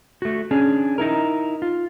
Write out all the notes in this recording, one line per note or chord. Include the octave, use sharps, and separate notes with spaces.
A3 F#4
C#4 D4 G#4
D#4 E4 A#4
F4